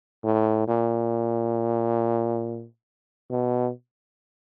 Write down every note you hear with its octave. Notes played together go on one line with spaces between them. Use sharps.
A2
A#2
B2